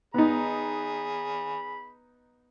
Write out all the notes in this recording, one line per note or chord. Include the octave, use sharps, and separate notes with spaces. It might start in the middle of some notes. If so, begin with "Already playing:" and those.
B3 D#4 G#4 B5